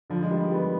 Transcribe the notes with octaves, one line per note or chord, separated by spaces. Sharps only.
D3 F3
G#3
D#3 G3
G3 B3